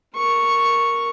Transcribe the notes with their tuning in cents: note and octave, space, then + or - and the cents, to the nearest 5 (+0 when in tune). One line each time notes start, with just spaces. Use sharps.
A#4 +0 C#6 +0